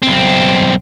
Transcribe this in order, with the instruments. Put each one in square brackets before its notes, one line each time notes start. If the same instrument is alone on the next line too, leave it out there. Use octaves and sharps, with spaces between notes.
[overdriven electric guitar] B1 C4